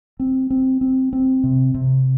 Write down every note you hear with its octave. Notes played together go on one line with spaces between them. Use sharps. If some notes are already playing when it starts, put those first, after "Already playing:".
C4
C4
C4
C4
C3
C3